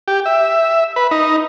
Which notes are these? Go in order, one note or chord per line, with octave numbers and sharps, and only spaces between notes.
G4
E5
B4
D#4